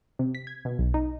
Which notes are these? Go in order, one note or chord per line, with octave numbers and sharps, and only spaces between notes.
C3
B6
G#6
B2
B1
D#4